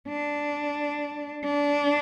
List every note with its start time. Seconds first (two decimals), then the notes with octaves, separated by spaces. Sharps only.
0.09 D4
1.45 D4